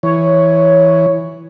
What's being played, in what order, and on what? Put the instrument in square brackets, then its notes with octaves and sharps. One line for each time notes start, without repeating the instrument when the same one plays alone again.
[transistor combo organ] E3 [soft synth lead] C#5